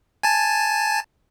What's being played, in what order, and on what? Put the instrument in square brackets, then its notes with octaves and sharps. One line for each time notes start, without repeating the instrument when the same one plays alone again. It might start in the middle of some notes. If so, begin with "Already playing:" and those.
[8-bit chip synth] G#5 A5